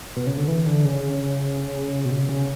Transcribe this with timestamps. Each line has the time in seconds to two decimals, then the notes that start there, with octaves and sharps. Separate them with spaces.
0.16 B2
0.27 C#3
0.37 D3
0.48 E3
0.66 D3
0.85 C#3
2.05 B2
2.11 C#3
2.29 C#3